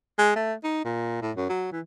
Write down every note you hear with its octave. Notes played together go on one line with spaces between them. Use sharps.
G#3
A3
D#4
A#2
A2
F#2
F#3
E3